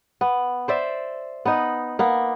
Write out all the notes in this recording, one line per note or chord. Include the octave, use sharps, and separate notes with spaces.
B3
C5 D5 E5
B3 D#4
A#3 B3